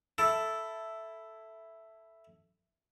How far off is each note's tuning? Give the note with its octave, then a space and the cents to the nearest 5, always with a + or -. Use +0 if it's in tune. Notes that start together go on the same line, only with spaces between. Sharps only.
E4 +0 A4 +0